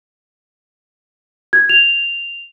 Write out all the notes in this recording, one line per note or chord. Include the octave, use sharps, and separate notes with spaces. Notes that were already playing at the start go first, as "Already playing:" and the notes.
G#6
F7